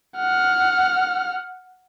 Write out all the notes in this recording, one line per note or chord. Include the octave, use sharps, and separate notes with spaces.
F#5 F6